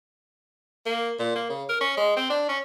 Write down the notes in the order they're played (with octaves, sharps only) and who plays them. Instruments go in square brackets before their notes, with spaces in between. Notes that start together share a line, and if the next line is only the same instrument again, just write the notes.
[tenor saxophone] A#3
A#2
A#3
C#3
A#4
C#4
G#3
C4
D4
C#4